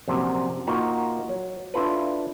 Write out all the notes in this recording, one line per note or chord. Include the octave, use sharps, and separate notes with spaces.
A#1 F#2 C3
A#2 A#3 D#4 F#4
F#3
D4 E4 F4 A4 B4